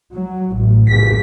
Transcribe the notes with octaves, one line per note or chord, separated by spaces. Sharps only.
F#3
A1
B6